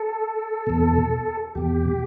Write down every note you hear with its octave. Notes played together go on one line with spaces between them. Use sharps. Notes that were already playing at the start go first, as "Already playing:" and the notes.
Already playing: A4
E2 B2
E2 B2 G4